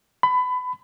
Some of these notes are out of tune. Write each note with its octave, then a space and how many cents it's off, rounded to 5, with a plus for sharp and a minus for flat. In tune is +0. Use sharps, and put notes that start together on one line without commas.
B5 +25